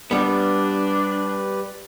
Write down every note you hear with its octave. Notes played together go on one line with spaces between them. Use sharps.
G3 B3 D4 G4 B4 D5